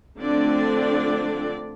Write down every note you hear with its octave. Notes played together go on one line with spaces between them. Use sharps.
D3 F3 A3 C4 D4 D5